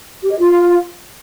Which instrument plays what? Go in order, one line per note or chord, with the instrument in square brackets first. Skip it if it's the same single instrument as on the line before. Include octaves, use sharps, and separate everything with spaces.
[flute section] G4
D#5
F4